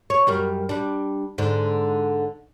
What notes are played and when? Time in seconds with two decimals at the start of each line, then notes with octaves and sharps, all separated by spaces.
0.10 C#5
0.27 F#2 G3 A#4
0.69 G3 D4
1.38 G#2 D3